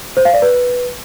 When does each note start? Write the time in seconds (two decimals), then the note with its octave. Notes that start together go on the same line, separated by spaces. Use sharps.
0.17 C5
0.25 F5
0.34 D5
0.42 B4